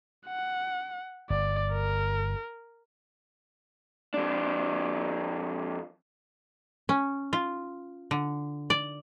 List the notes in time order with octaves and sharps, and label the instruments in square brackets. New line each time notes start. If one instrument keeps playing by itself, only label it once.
[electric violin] F#5
[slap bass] G1 [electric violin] D5
[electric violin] A#4
[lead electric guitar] F2 D4
[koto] C#4
F4
D3
D5